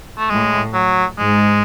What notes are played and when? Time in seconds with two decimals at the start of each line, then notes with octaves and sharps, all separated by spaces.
0.18 A3
0.30 A2 G#3
0.74 F#3
1.18 G#2 G#3